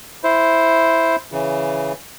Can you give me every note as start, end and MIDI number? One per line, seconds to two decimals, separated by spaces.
0.24 1.16 64
0.24 1.16 72
1.32 1.92 49
1.32 1.92 52